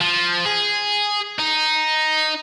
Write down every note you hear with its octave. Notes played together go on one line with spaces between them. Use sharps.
F3
G#4
D#4